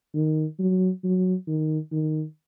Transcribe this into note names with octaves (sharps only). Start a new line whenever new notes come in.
D#3
F#3
F#3
D#3
D#3